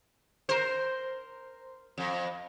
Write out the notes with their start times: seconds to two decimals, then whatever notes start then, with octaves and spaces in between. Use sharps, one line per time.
0.49 A#4 C5
1.98 F2